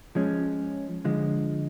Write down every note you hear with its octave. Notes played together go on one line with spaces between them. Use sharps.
F3 G#3 C#4
D3 F3 G#3